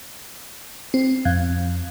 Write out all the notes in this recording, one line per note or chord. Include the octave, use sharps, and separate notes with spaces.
C4
F2